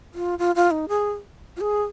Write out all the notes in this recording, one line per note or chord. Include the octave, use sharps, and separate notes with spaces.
F4
F4
F4
D#4
G#4
F4
G#4